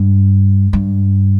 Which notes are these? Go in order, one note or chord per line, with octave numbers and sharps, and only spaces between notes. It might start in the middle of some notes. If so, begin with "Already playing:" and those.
Already playing: G2
G2